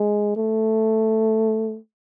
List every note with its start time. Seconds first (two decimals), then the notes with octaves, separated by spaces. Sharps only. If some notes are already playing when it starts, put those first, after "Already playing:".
Already playing: G#3
0.36 A3